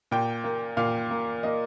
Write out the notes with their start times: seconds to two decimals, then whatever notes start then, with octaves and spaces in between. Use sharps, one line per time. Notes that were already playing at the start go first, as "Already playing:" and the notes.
0.11 A#2 G5
0.44 A#3
0.77 A#2 F5
1.11 A#3
1.43 A#3 D#5